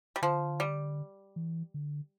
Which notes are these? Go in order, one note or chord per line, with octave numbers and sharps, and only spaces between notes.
G3
D3 F3
G3
E3
D3